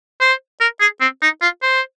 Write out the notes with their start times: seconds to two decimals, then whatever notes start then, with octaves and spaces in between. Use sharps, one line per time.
0.20 C5
0.60 A#4
0.80 G#4
1.01 C4
1.22 D#4
1.42 F4
1.62 C5